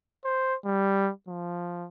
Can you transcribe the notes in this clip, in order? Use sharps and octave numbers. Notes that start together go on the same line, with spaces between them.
C5
G3
F3